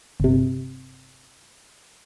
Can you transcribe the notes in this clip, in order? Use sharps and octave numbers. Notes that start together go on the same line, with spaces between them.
G1 C3